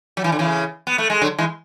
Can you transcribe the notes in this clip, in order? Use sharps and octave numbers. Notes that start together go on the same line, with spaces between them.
F#3
E3
D3
C#3 E3
B3
A3
G#3
D3 F#3
E3 G#3